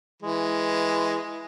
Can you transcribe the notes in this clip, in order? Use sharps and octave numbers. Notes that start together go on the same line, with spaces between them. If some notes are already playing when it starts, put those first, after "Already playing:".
E3 G#3